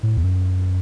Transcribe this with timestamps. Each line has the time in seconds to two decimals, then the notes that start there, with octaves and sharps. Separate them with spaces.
0.03 A2
0.17 E2
0.23 F#2